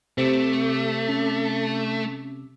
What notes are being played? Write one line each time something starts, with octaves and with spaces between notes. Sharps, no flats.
C3 A3 D6 E6
C#4